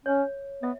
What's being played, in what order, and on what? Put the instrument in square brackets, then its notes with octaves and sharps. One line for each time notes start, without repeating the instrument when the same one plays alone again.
[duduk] C#4 [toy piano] C#5
[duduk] B3 [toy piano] E5